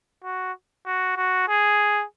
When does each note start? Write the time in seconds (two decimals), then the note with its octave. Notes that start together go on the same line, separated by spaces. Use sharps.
0.24 F#4
0.86 F#4
1.17 F#4
1.48 G#4